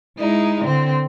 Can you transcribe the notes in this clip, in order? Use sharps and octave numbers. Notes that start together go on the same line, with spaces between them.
G#3 D#4 E4
D3 C4